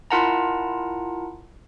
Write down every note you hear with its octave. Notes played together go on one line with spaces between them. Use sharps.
E4 F4 A#4 F#5 A5 A#5